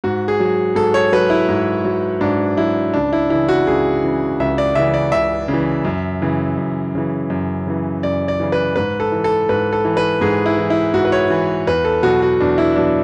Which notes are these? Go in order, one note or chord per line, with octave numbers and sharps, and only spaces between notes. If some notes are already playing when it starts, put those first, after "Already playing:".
G#2 F#4
G#4
F#3
G#2 A4
C#5
F#3 B4
E4
G#2
F#3
G#2 D4
F#3 E4
C#2 D4
E4
C#3 E3 E4
F#4
C#2 G#4
C#3 E3
C#2 E5
D5
C#3 E3 E5
D5
C#2 E5
C#3
E3
F#2
C#3 E3
F#2
C#3 E3
F#2
C#3 E3
F#2 D5
D5
C#3 E3
B4
G#2 B4
A4
E3
A4
G#2 B4
A4
E3
B4
G#2 G#4
E4
E3
E4
G#2 F#4
B4
C#5
E3
E2 B4
A4
B2 F#3 F#4
F#4
E2 D4
E4
B2 F#3 D4